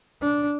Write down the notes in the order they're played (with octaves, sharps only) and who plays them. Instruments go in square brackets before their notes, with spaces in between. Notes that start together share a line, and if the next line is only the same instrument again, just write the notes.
[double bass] D4